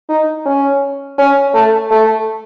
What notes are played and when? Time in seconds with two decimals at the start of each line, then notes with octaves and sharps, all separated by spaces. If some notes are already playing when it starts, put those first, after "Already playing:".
0.09 D#4
0.46 C#4
1.18 C#4
1.54 A3
1.91 A3